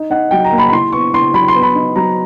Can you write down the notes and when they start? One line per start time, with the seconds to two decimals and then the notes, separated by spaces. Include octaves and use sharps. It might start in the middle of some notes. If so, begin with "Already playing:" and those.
Already playing: D#4
0.10 D#4 F#5
0.31 F#3 G5
0.45 A#5
0.51 A#3
0.58 B5
0.68 B5
0.72 E4 C6
0.92 B3 C#6
1.13 E4 C6
1.34 F#3 B5
1.48 C6
1.55 B3
1.63 B5
1.75 D#4
1.96 F#3 A#5